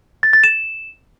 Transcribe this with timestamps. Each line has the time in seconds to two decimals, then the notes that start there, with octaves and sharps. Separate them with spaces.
0.23 A6
0.33 A6
0.44 E7